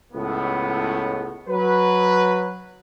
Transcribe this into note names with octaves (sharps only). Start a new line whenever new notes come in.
C#2 A2 B3
F#3 B4